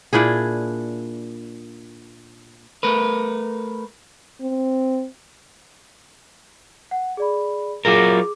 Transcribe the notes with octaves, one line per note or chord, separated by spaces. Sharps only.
A#2 D4 E4 G#4
A3 A#4 B4
C4
F#5
G#4 D5 B5
F#3 F4 G#4 A#4 D6